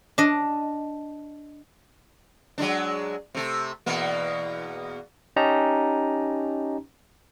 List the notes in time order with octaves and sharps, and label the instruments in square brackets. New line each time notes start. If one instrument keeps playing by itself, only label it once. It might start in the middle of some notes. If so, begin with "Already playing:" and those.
[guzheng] D4 D#5
[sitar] F#3 G#3 D4
C3 A3
E2 B2 A#3
[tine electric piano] C#4 D#4 G4 A5 A#5